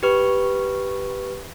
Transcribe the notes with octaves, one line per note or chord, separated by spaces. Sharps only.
G4 B4 C#6